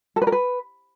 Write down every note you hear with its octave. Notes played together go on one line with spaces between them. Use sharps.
A4
B4
A#4
B4